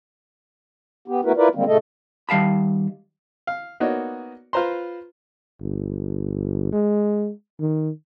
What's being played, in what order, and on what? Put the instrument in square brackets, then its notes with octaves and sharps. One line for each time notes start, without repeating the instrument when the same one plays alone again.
[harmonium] B3 G4
A3 B3 E4 F#4 A#4 B4
E4 F4 A#4 B4 D5
D3 D#3 G3 G#3 A#3 C4
A#2 C#3 A3 A4 D#5
[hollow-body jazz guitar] D#3 G3 F5 A5 B5
[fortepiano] F5
A#3 B3 D#4 F#4 C#5 D5
F4 B4 C5 A#5 C6
[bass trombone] G1
G#3
D#3